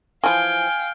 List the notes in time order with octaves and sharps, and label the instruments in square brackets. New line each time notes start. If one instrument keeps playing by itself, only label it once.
[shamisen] E3 F3 [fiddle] F5 G5 [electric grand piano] G#5 [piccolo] F6